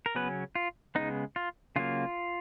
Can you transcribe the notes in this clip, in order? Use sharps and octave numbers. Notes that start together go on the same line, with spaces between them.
A#4
C#3 F#3 B3 C#4 B4
F4
C#3 G#3 B3 D#4
F4
C#3 F#3 A#3 F4